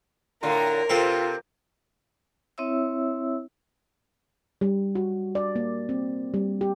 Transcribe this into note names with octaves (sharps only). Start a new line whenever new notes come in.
A2 D3 F4 A#4 A#5
C3 C4 F4 A4 B4
C4 E4 C#5 E5 E6
G3
F#4
D5
A#3
C4
G3
G4